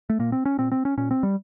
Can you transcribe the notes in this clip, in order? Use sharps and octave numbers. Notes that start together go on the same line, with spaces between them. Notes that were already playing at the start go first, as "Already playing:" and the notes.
A3
A#2 A#3
C4
C#4
A#2 C4
C4
C#4
A#2 C#4
C4
G3